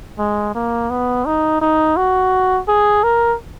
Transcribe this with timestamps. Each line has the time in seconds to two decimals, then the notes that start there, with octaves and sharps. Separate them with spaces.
0.19 G#3
0.55 A#3
0.90 B3
1.26 D#4
1.62 D#4
1.97 F#4
2.68 G#4
3.04 A#4